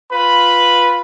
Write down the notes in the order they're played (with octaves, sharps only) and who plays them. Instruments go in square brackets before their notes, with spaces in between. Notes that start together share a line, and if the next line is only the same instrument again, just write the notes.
[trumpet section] F4 B4 B5